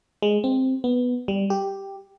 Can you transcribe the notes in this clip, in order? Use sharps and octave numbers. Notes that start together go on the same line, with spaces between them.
G#3
C4
B3
G3
G4